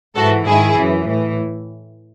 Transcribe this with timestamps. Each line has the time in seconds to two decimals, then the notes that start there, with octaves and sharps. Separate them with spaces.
0.16 G#2 E3 F#4 A4
0.45 G#2 D#3 E4 G#4
0.75 F#2 E3
1.06 A2 E3